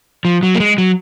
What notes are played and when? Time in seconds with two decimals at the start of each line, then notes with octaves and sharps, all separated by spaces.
0.25 F3
0.43 F#3
0.55 A#3
0.60 G#3
0.78 F#3